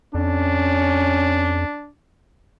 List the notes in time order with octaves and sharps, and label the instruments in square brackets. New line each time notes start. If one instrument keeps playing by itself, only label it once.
[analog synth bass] F2 [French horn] C#4 [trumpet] D4